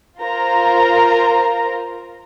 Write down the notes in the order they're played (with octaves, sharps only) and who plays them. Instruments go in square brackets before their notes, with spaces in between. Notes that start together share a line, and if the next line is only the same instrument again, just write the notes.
[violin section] F4 A#4 C5 A#5